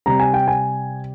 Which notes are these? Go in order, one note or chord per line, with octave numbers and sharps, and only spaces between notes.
C3 G3 C4 A#5
G#5
G5
G#5